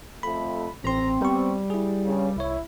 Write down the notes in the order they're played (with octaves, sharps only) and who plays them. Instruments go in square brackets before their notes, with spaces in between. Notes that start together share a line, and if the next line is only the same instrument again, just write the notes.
[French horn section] F2 A3 [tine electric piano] B5
[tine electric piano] A1 C6 [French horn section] C4 [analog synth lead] A#5
[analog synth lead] G3 [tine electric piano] B3 C#6
[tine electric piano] E4 G#4
[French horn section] G2 C#3
[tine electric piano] C2 C#5 [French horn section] E4